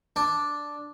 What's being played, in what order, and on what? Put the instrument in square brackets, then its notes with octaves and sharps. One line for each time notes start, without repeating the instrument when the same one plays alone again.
[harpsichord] D4